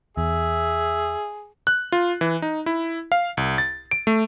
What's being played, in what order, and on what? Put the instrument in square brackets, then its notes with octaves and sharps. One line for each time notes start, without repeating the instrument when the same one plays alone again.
[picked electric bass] E2 [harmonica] G#4 [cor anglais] E5
[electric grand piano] F#6
F4
E3
D#4
E4
F5
C2
A6
D7
A3